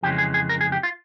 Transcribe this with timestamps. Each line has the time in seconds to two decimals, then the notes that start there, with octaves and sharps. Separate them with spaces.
0.03 F2 C#3 E3 G#3 G4
0.18 G#4
0.34 G#4
0.49 A#4
0.61 G#4
0.72 G4
0.83 F4